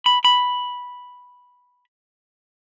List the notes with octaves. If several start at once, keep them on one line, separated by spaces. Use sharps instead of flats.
B5
B5